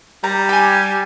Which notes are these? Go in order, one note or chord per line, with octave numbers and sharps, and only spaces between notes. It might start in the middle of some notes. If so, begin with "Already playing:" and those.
G3 A#5
G4 G#5